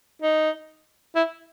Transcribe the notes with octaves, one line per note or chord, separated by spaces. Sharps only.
D#4
E4